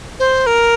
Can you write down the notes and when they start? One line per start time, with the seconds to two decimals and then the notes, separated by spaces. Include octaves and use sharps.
0.20 C5
0.46 A#4